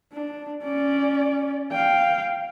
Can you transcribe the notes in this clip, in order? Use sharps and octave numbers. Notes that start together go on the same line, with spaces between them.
D4
C#4 D5
F5 G5